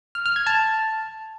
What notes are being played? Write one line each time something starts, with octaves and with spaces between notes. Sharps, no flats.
F6
F6
G#6
A5